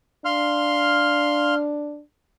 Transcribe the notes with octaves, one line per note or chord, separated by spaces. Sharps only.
D4 F5 C6 F6